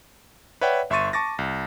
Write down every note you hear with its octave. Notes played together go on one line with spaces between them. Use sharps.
B4 C#5 D5 E5 F#5 G5
G1 E5 C6 C#6 A6 D#7
A5 C#6 D6 A6 A#6
C2